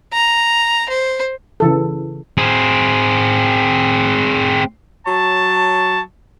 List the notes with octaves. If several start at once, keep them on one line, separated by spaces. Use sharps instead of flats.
A#5
C5
C#3 E3 A4
C4 G#4
F#3 C#5 A5